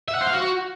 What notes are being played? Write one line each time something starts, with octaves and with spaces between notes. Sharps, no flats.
E5
F#5
C5
F5
F#4